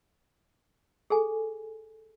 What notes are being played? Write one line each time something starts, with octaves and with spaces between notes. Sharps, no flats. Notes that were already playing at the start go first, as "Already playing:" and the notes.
G#4 A4 G#5